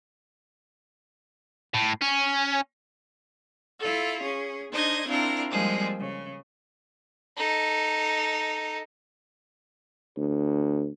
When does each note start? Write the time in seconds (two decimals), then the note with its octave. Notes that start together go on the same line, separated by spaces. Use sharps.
1.74 A2
2.01 C#4
3.80 E4 F4 A4
4.21 C#4 G#4
4.72 D4 D#4 C5 D#5 G#6
5.08 C4 D4 E4 F4 A#4
5.50 F3 G3 G#3 A#3 C4 G#4
5.98 C#3
7.37 D#4 A4
10.17 D2